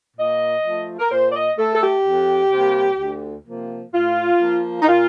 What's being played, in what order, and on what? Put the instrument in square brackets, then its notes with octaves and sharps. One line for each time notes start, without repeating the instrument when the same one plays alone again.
[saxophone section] A#2 D#5
F3 A3
A#4
A#2 C5
D5
D#5
A3 A4
A4
G4
F2
C3 G3 A#3
D2
C3 F3 A#3
A2 F4
F3 A#3
D#4
A#2 F4